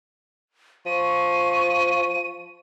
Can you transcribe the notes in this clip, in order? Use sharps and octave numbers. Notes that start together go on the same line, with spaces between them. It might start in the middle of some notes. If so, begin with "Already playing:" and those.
F3 C#6 D#7